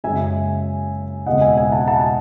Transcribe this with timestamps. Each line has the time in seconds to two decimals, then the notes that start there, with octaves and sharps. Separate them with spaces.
0.04 F#1 F#2 C#3 G#3 E5 G#5
1.26 E1 E2 C#3 G#3 C4 D#5 F#5
1.41 E5 G#5
1.57 E5 G#5
1.72 F#5 A5
1.87 F#5 A5